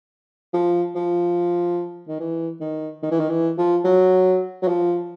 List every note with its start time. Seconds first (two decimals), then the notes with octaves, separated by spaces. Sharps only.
0.54 F3
0.95 F3
2.08 D#3
2.20 E3
2.60 D#3
3.03 D#3
3.11 E3
3.20 D#3
3.30 E3
3.58 F3
3.85 F#3
4.63 F#3
4.68 F3